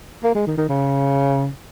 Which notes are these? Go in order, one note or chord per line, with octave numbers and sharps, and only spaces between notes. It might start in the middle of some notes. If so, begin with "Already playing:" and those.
A#3
G#3
D#3
D#3
C#3